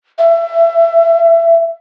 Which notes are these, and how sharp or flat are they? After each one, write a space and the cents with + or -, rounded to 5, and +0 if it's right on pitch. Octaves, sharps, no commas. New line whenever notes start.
E5 +30